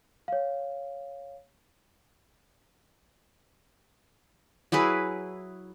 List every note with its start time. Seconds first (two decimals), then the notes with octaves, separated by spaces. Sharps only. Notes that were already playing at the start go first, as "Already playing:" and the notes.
0.28 C#5 F5
4.72 F#3 E4 G#4 B4